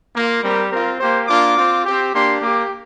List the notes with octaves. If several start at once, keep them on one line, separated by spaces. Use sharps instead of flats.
A#3 F4
G3 C4 G4 A#4
C4 F4 A#4
A#3 G4 C5
A#3 D4 F4 D6
C4 F4
C4 G4
A#3 D4 G4 C6
A#3 G4 D6